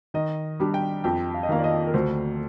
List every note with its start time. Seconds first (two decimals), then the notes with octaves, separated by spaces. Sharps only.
0.14 D#3 D#5
0.60 G3 D4 G4
0.74 G5
1.04 F2 G5
1.34 F5
1.43 D#5
1.49 D#3 A#3 F5
1.59 D5
1.64 D#5
1.87 A#4
1.94 D2 C5